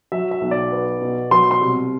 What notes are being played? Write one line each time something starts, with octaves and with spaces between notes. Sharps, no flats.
F#3 E5
E5
B1
D5
B3
B2
F#3 C6
C6
C2